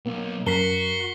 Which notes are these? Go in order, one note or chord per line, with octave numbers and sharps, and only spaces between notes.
B1 A#3
F#2 F#4 A#4 B6 C7 G7